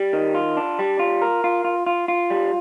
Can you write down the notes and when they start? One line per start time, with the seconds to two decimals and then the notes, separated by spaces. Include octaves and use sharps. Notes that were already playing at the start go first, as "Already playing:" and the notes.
Already playing: G3
0.13 D#3
0.35 F4
0.57 D4
0.79 G3
0.99 F4
1.22 A#4
1.44 F4
1.65 F4
1.86 F4
2.08 F4
2.30 G3